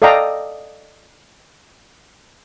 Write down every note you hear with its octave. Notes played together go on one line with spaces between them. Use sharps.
A4 D5 D#5 F5 G5 A#5